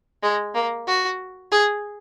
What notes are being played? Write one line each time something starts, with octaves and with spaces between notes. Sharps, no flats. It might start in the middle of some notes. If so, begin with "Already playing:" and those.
G#3
A#3
F#4
G#4